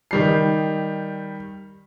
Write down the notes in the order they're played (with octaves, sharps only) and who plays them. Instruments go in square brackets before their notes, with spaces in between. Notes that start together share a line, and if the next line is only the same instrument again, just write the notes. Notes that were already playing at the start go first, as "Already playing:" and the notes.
[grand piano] D#3 G3 C7